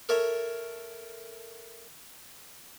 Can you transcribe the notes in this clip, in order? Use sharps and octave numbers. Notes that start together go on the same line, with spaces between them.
A4 A#4 C#5 E5